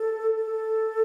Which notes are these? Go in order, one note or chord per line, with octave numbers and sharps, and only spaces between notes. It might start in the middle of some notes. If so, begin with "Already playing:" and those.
Already playing: A4
A4